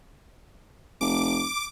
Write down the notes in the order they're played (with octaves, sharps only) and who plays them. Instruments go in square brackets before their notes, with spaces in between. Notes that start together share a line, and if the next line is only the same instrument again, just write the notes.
[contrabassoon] F1 [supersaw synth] D6